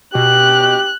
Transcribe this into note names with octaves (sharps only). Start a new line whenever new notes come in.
B2 G4 F#6